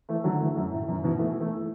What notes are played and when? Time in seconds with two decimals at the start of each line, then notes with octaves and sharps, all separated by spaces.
0.09 E3 A3
0.24 D3 F#3
0.40 E3 A3
0.56 F#2
0.71 A2
0.88 F#2 B2
1.03 B2 E3
1.19 E3 A3
1.40 E3 A3